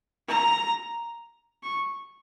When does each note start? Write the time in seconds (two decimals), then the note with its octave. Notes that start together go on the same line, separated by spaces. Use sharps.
0.28 A#5
1.63 C#6